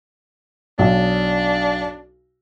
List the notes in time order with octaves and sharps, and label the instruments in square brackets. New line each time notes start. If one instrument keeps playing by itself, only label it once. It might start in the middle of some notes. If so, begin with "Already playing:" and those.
[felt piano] B1 [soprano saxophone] D4